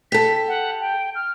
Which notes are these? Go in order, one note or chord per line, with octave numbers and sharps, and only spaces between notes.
G4 A4 B6
F#5
G5
F6